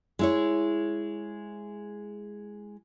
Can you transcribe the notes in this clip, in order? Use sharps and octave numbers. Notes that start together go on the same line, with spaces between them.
G#3 E4 C#5